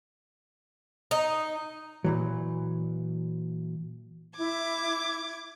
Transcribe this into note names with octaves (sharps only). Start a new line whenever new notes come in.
D#4
A#2 E3 F#3
E4 D6 G#6